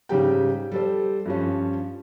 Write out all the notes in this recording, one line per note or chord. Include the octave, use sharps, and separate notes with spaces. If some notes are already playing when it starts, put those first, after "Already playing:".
G#2 C#3 G3 G4 G5
G3 A4 C5
G2 F3 C#4